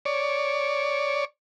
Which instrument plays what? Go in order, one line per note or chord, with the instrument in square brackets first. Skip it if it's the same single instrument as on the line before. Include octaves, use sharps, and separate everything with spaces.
[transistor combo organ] C#5 D5